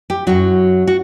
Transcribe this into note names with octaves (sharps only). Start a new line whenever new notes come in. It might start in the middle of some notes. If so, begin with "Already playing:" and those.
G4
F#2 F#3 F#4
F#4